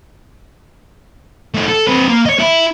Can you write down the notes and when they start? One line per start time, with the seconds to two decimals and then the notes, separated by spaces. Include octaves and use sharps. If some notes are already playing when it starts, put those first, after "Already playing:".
1.54 A3 D#4
1.68 A4
1.87 C4 B4
2.08 A#3
2.26 C#5 D#5
2.39 E4